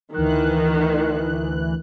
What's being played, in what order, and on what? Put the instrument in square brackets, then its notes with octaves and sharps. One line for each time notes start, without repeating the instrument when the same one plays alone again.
[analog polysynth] D2 E3 F#6 [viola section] D#3